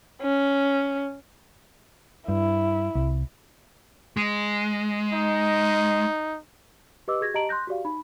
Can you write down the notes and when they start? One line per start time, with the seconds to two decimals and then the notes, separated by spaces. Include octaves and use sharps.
0.22 C#4
2.28 G2 E4
2.95 C2
4.17 G#3
5.13 D#4
7.08 G4 B4 D#5 D6 E6
7.21 F#4 G#4 G#6 A#6
7.34 G4 D#5 A5 A#5 D7 F#7
7.49 C6 F#6 G6 A#6
7.67 F#4 G4 D5 F5
7.85 D#4 B5